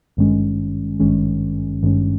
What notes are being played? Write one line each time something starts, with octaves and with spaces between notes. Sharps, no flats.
G#1 G2 D#3 G#3 C#4
G#1 G2 D#3 G#3 C#4
G#1 G2 D#3 G#3 C#4